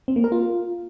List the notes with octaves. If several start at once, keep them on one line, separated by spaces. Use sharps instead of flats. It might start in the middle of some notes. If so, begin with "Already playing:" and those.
C4
A#3
A#4
F4